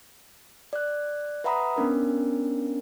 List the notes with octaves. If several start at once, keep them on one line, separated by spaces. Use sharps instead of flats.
D5 F#6
B4 E5 F#5 A#5 B5 D#6
B3 C#4 D4 A#4